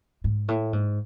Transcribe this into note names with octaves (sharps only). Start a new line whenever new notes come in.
G#2
A2
G#2